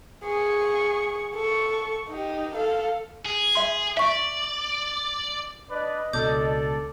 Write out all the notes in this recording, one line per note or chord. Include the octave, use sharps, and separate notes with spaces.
G#4 C#6
A4 C#6
D#4 G4
A4 F5
G#4
E5 C6
D5 E5 C#6
D4 B4 D5 D#5
C#2 B2 D4 A4 D5 D6 G6